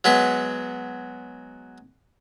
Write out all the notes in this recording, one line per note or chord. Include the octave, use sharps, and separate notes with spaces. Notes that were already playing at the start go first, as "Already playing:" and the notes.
F#3 G#3 B3 B4